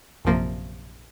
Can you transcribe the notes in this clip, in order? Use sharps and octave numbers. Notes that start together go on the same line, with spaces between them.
A#1 F#2 C3 F3 A#3